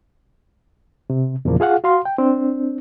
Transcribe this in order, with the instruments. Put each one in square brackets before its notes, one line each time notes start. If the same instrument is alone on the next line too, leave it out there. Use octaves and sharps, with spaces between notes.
[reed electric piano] C3
E2 A#2 C#3 F3 A#3
F4 G#4 F5 F#5
F#4 F5 C6
G5
C4 D4